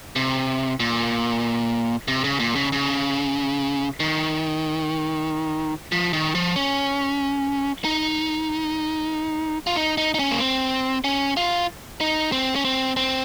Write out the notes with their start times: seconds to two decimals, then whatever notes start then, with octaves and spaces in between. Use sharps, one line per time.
0.16 C3
0.80 A#2
2.08 C3
2.24 C#3
2.40 A#2
2.55 C#3
2.72 C#3
4.00 D#3
5.92 F3
6.13 D#3
6.35 F3
6.56 C#4
7.85 D#4
9.67 F4
9.76 D#4
9.98 D#4
10.14 D#4
10.19 C#4
10.31 A#3
10.40 C4
11.04 C#4
11.37 F4
12.01 D#4
12.32 C4
12.56 C#4
12.65 C4
12.97 C4